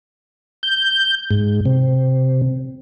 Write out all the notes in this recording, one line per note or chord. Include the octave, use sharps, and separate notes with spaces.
G6
G#2
C3